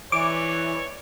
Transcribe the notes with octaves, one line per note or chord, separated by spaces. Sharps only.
E3 C#5 D5 D6